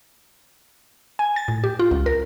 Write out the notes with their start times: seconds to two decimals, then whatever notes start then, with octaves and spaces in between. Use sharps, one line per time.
1.19 G#5
1.36 A6
1.48 A2
1.64 G4
1.79 F4
1.91 C#2
2.06 A#4